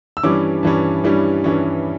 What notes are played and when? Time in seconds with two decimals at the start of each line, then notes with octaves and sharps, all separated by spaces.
0.17 E6
0.23 G2 E3 G3 C#4 D6
0.63 G2 E3 G3 C#4
1.03 G2 E3 G3 C#4
1.44 G2 E3 G3 C#4